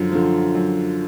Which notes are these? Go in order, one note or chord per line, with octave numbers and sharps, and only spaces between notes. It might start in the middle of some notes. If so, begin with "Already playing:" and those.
Already playing: F#2 D3 F3
D3 F3
F#2